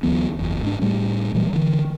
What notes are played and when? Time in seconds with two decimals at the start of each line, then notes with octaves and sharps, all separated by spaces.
0.03 D2 E3 F#3 B3
0.39 F#1 E2
0.63 G#2 D4
0.82 A2 G3 A3
1.34 A#2 E3 F#3 G3
1.53 D3 E3